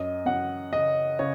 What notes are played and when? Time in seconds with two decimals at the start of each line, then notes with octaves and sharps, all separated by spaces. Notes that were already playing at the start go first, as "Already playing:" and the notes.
Already playing: F#2 D#5
0.26 F#2 F#5
0.73 C#3 D#5
1.19 C#3 C#5